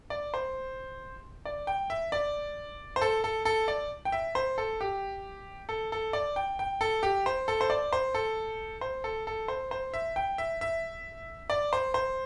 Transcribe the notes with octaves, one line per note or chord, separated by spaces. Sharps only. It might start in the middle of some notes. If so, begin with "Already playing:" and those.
D5
C5
D5
G5
E5
D5
C5
A4
A4
A4
D5
G5
E5
C5
A4
G4
A4
A4
D5
G5
G5
A4
G4
C5
A4
C5
D5
C5
A4
C5
A4
A4
C5
C5
E5
G5
E5
E5
D5
C5
C5